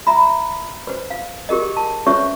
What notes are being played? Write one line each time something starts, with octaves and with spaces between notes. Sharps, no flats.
E5 A#5 B5
B4 C5
F5
G4 G#4 A#4 D#5
A5
C#4 G#4 B4 C#5 E5 C#6